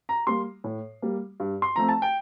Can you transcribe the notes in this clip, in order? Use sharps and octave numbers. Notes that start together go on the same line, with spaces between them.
A#5
G3 A#3 C6
A2
G3 A#3
G2
C6
F3 A3 C4 A#5
A5
G5